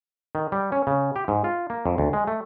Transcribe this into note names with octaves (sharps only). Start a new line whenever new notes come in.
D#3
G3
C#4
C#3
G4
G#2
F4
A#3
F2
D2
G#3
A3